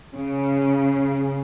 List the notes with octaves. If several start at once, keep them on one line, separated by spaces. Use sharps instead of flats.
C#3